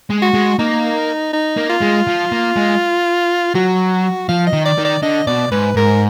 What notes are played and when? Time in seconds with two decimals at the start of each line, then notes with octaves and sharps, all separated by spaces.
0.10 G#3
0.22 F#4
0.34 G#3
0.59 A#3 D#4
1.33 D#4
1.57 A#3
1.69 F4
1.82 G#3
2.07 F3
2.32 A#3
2.56 G#3
3.55 F#3 F#4
4.29 F3 F5
4.47 D#5
4.53 D#3
4.66 D5
4.78 D#3
4.85 D5
5.03 D3 D#5
5.27 B2 D5
5.52 G#2 B4
5.76 G#2 A#4